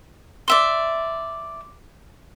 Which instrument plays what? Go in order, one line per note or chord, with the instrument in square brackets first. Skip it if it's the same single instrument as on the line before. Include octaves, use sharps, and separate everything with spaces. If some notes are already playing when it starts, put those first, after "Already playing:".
[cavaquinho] D5 E5 C6